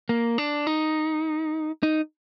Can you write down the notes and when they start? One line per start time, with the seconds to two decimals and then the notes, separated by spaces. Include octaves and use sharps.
0.09 A#3
0.38 D4
0.67 D#4
1.83 D#4